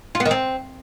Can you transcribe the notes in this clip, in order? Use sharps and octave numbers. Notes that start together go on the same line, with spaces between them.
F4
B3
D#3
C4